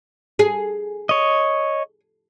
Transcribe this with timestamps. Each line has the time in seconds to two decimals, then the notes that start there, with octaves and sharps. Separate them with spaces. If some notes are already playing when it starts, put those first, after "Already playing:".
0.39 G#4
1.09 C#5 D#5